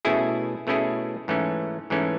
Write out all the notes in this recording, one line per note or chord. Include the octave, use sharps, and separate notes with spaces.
B2 A3 C#4 E4 G#4
B2 A3 C#4 E4 G#4
G#2 E3 A3 C#4
G#2 E3 A3 C#4